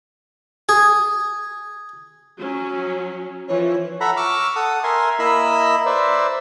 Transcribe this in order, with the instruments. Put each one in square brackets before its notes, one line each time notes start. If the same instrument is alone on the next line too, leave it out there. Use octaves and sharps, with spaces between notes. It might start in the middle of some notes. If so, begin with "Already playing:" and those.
[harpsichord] G#4
[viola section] F#3 C#4
[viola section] E3 F3 [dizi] C#5
[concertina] A4 E5 F#5 A#5 B5
C#6 D6 E6 F6
A4 F#5 D#6
A#4 E5 G#5 C6
A#3 E4 D#5 B5 E6
B4 C5 D5 E5